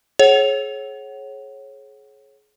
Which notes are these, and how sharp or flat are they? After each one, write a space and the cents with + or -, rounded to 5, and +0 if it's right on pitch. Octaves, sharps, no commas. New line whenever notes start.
G#4 +30 C#5 -25 F#5 +20